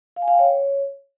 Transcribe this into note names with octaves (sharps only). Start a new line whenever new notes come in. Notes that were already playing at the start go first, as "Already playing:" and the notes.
F5
G#5
F5
G5
C#5